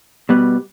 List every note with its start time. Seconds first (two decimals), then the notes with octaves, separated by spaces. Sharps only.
0.29 B2 G3 B3